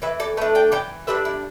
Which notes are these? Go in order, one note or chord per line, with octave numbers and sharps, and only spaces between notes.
E3 B4 E5
A4 D5
A3 D4 B4 E5
D5 G5
E3 D5 G5
G3 D4 B4 E5
E4